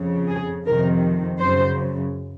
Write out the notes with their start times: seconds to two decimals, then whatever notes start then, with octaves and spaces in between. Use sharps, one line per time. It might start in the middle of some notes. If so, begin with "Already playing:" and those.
Already playing: F2 C#3
0.29 G#4
0.66 F2 C3 D#3 A#4
1.39 F#2 C#3 C5